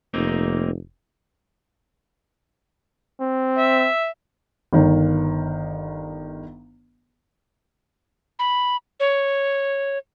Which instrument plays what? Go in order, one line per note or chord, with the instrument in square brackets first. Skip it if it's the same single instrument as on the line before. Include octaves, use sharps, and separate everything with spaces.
[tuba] F1 [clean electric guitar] A#3 C4 D#4
[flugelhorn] C4
[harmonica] E5
[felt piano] G1 D#3
[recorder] B5
C#5